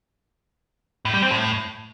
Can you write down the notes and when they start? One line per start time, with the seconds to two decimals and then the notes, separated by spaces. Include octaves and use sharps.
1.05 A2
1.14 G3
1.22 C4
1.31 A2